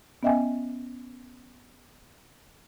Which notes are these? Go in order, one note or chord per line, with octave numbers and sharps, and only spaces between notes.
B3 C#4 D#5 E5 G5 G#5